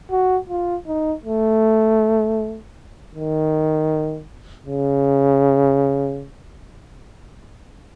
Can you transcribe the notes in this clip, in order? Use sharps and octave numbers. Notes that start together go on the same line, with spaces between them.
F#4
F4
D#4
A3
D#3
C#3